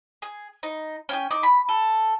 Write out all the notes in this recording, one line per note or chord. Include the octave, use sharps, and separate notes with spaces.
G#4
D#4
C#4 G5 G#5
D#4 D5
B5
A4